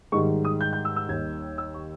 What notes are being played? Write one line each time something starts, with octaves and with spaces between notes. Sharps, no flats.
G#2 D#3 G3 C#6
D#6
G6
G6
E6
E6
D#2 D#3 G3 G#6
E6
C#6